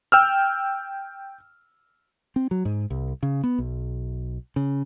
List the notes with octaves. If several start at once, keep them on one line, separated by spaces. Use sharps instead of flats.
G5 E6 F6
C4
F#3
G#2
C2
C#3
B3
B1
C#3